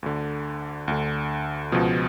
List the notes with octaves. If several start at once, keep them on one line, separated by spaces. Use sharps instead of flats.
D2 D3
D2 D3
C#2 B2 F3